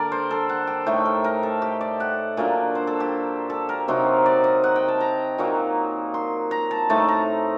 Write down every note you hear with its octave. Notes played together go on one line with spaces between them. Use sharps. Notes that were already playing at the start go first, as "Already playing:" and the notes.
Already playing: D3 G3 A#3 D4 A#4 D5
C5
A4
F#5
G5
A2 A3 D#4 G5
A#4
A#4
A4
G4
D5
F#5
A#2 F#3 A#3 D4
C5
A4
G4
A4
A#4
C3 F#3 C4 D#4
D5
D#5
F#5
G5
A5
A#5
A#2 F#3 A#3 D#4
C6
A#5
A5
A2 A3 C4 D#4 A5
A#5